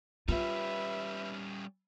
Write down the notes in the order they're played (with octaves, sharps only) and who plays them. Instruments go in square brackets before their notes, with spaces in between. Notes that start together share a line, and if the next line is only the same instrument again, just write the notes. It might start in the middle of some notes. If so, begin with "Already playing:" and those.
[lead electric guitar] G3 C#4 [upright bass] F4 [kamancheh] B4 E5